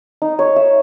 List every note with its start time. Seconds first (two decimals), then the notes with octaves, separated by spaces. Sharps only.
0.22 D#4
0.39 C#5
0.56 E5